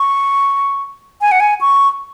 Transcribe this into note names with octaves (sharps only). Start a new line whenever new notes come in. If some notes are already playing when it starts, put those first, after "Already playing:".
Already playing: C#6
G#5
F#5
G#5
C#6